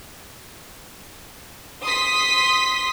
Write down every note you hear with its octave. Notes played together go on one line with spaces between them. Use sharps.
C6 D#6 B6